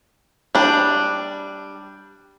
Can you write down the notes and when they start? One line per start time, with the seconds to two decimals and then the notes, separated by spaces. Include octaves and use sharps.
0.55 G3 D4